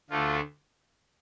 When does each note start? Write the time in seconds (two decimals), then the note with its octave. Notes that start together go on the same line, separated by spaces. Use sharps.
0.10 D2 D3 A3 F4